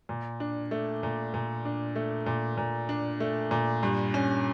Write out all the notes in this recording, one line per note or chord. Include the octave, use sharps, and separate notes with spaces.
A#2
D4
A3
A#2
A#2
D4
A3
A#2
A#2
D4
A3
A#2
G2
C#4